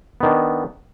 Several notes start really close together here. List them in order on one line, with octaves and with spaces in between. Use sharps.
B3 D#3 D4